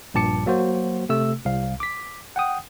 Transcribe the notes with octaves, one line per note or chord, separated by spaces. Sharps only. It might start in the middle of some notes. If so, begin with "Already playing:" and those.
A#1 G2 A#2 A5 D6 C#7
F#3 A#3 F#4 C5
C3 A3 E6
C2 F5
D6 B6
F#5 G5 D#6